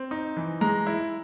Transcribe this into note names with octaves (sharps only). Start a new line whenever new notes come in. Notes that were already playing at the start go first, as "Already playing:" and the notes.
Already playing: C4
D#4
E3
G#3 A#5
E4